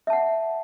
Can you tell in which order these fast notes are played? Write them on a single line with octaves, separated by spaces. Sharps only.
E5 A5 F#5